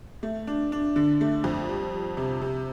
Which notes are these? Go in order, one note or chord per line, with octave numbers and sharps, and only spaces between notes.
A3
D4
D4
D3
A3
F2
G3
G3
C3
C3